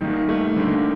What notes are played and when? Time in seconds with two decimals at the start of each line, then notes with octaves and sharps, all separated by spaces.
0.01 D#3 G3 A#3 D#4 G4
0.29 A3
0.56 D3 G3 A#3 D#4 G4